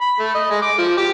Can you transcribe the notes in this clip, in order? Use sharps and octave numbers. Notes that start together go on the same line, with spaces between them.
B5
A3
D#5
G#3
D6
F3
G4